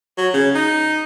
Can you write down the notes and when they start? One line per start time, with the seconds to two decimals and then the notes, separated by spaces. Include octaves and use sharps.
0.18 F#3
0.34 C#3
0.55 D#4